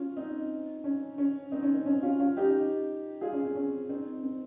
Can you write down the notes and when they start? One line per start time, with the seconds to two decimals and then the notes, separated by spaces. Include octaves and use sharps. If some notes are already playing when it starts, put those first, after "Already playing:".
Already playing: C#4 F4
0.16 C4 D#4
0.84 C#4
1.18 C#4
1.52 C4 D#4
1.63 C#4
1.74 C4
1.86 C#4
2.03 C#4 F4
2.20 C#4 F4
2.37 D#4 G4
3.21 F4 G#4
3.33 C#4
3.44 C4
3.56 C#4
3.89 C4 D#4
4.23 C4